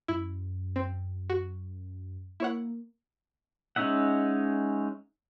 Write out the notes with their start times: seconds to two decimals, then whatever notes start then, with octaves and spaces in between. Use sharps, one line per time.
0.08 F#2 E4
0.76 C4
1.30 F#4
2.40 A#3 E4 C#5 F#5
3.76 G#3 C#4 D#4 E5 F#5